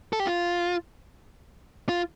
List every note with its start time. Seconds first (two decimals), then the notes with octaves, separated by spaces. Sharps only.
0.13 A4
0.20 G4
0.27 F4
1.89 F4